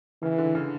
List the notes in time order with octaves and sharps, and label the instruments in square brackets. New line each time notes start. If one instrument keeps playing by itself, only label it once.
[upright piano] C#3 [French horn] E3
[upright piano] D3
C#3